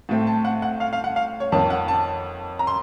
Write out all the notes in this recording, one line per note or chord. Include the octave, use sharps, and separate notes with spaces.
A2 A3 C4
A5
F#5
F#5
F5
F5
F#5
F5
C#5
F2 D#3 A#3 C#4 A5
F#5
A5
A#5
C6